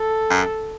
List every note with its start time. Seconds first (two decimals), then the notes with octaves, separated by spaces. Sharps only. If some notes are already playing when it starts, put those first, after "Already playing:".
Already playing: A4
0.30 F#2